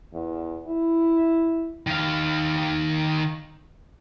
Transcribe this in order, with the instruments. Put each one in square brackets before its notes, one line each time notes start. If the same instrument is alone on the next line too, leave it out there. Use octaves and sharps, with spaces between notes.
[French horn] E2
E4
[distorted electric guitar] D#3 F5